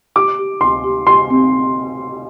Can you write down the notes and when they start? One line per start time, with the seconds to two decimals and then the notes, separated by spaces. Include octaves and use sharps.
0.16 G4 D6
0.39 G4
0.61 D2 C6
0.84 G4
1.07 G4 C6
1.30 C4